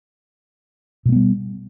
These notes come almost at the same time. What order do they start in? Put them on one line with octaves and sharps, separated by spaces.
B2 A3 B3 G3